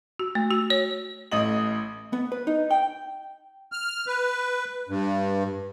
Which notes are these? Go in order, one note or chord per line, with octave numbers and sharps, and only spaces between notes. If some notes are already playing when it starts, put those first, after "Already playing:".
F#4
A3
F#4
C#5
A1 A2 D#5 D#6 F#7
B3
B4
D#4
G5
F6
B4
G2